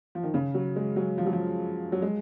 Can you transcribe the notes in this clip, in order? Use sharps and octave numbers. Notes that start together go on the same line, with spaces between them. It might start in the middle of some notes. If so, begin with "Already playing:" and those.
F3
D#3
C#3
F#3
G#3
F#3
F3
F#3
F3
F#3
G#3